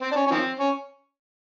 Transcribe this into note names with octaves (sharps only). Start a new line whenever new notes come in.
C4
D4
C#4
C#4
D#3 F3 C4
C#4